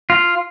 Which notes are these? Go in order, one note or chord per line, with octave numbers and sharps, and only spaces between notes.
F4